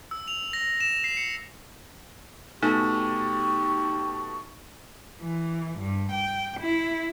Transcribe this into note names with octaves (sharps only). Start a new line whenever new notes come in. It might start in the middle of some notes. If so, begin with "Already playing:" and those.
E6
F7
A#6
E7
C7
C#7
B2 A3 D#4 G4 C#6
E3
G2
G5
E4